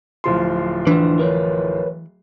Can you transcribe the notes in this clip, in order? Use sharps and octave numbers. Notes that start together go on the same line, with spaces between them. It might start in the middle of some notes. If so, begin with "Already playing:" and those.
D1 F3 C6
E3 D4 C5
A#4 B4 C#5